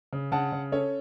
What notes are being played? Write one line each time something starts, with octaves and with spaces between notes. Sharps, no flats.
C#3
C#3 F#5 A5
C#3
C#4 A4 C#5